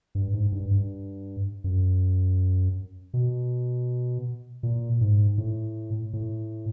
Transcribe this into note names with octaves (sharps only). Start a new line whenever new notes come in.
G2
G#2
G2
G2
F#2
B2
A#2
G#2
A2
A2